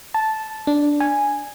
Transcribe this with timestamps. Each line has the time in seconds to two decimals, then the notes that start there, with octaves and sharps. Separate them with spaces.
0.14 A5
0.67 D4
1.00 G#5